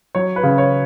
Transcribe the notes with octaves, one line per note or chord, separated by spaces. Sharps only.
F#3 C#5
B4
C#3
C#5